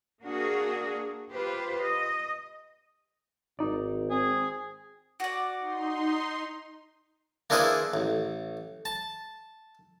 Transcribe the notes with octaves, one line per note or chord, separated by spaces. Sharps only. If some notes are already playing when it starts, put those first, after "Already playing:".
A#3 D4 F#4 G#4
F4 G4 B4 C5
D#5
G#1 D#4 D5
C4 G#4
F#4 D5
D#4 C6
A#3 D4 E4 G#4 B4 C5
A1
A5